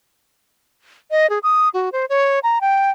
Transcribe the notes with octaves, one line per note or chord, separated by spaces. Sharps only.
D#5
G#4
D#6
F#4
C5
C#5
A#5
G5